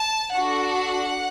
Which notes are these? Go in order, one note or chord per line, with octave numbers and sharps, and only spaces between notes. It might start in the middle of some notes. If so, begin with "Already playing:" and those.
Already playing: A5
D4 F#4 A4 F#5